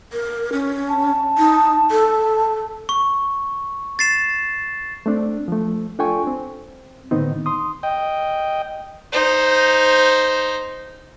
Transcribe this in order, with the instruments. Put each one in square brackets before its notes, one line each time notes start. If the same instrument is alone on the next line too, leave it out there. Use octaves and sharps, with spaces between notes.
[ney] A#4
C#4
[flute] A5
[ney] D#4
A4
[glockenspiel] C#6
A6 C7 E7
[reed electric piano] A3 C4 D4
F3 A3
D4 F4 A4 G5 G#5 C#6
C4
A2 D3 D#3 B3 C4 D#4
C6 D#6
[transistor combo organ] D#5 G5
[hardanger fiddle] D#4 C5